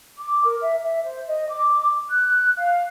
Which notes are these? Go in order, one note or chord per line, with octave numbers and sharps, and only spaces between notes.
D6
A#4
E5
E5
C5
D#5
D6
F#6
F5